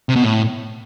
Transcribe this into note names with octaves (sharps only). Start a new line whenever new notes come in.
C3
B2
A2